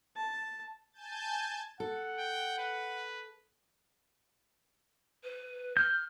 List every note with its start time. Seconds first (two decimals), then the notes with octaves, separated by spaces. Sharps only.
0.16 A5
0.93 G#5 A5 G6 A6
1.80 A4 F#5
2.19 G5
2.59 B4
5.24 B4
5.77 F6 G6